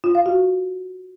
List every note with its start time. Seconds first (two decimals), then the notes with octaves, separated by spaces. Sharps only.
0.04 F4
0.15 F5
0.26 F#4